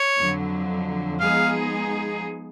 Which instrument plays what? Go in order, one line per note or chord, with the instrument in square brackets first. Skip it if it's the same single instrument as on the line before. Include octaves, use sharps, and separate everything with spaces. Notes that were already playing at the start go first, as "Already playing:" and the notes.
Already playing: [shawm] C#5
[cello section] F2 D3 F#3
[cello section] F3 G#3 B3 D#4 G#4 [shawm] F5